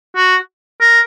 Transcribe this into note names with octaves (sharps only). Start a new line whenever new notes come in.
F#4
A#4